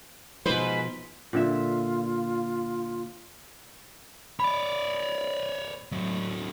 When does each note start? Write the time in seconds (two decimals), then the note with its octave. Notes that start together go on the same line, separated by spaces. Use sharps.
0.46 G#2 B2 F3 B4 C5
1.33 A#2 D3 F4 E5
4.40 C#5 D5 B5
5.92 F#3 C4